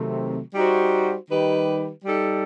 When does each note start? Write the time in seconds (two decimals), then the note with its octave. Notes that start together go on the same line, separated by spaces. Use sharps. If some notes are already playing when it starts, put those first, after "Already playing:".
Already playing: C3 D#3 F#3 A3 C4
0.54 G3 D#4 F#4 C5
1.30 D#3 G3 D#4 G4 B4
2.05 G3 D#4 A4